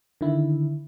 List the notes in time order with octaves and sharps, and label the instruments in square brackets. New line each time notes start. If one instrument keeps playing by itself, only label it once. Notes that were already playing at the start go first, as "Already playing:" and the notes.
[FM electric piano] D3 D#3 E4